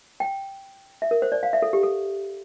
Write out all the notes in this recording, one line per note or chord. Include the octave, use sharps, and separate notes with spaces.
G5
E5
A#4
C5
D5
F5
E5
A4
G4
A4